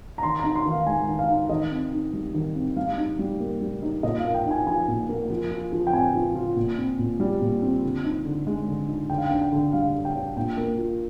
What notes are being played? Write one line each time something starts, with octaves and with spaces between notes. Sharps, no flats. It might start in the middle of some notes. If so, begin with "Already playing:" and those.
A#5
D#3 C6
D#4 A#5
C6
D#3
F5
G#3 G#5
D#3
F5
D#4
D#3 D#5
C4
D#4
G3
D#3
C4
G3 F5
D#4
G3
A#3
G3
D#4
A#2 D#5
F5
A#3
G5
D#4 G#5
F3 G#5
A#2
A#3
F3
F4
F3
G5
C4 G#5
F3
F4
A#2
C4
A#2
G3
A#2
C4
D3
D#4
D3
G#3
D3
D#4
D3 G5
F5
G5
D4
G5
D3
G3 F5
D3
G5
D4
A#2 G5
A#3
F4